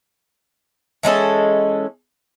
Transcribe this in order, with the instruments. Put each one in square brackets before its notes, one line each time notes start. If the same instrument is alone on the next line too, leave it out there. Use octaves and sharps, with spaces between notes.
[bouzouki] E3 G#3 C#4 A4